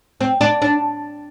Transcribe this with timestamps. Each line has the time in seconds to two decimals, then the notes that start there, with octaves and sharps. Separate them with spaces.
0.21 C4
0.41 D4
0.62 D4